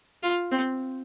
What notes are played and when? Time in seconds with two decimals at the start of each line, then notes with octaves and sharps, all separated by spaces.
0.23 F4
0.52 C4